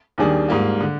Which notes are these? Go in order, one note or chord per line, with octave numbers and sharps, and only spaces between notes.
D#2 D#3 G3 D4 G#4
G#2 G3 A#3 F4
D3